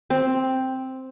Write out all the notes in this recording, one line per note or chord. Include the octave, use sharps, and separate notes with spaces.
C4